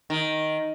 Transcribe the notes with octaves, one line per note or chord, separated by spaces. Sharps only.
D#3